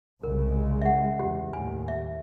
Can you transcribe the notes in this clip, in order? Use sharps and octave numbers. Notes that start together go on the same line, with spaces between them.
C2 C#3 G#3 A#4
E5 F#5
E2 G4
D#2 A2 G#5
E5